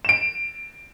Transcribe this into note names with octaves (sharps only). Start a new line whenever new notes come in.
D7 E7